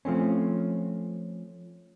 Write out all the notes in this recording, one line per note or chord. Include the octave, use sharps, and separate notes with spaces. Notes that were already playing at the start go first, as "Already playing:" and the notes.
F3 A3 C4 C#4